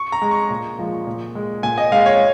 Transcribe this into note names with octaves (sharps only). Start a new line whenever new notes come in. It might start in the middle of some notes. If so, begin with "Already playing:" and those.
Already playing: C#6
A#5
G#3
C#6
A#2
F3 G#3
A#2
G#3
A#2 G#5
D#5
G#3 F5
C#5